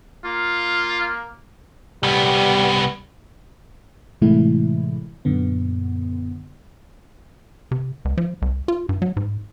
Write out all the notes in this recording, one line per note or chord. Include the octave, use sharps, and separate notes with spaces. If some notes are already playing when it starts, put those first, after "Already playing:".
A#3 F4
C2 G3 B3
A2 C3 E3 G#3 A3 E4
F#2 A#2 D3 B3
C3
C#2
F3
C2
F4
G2
F#3
G#2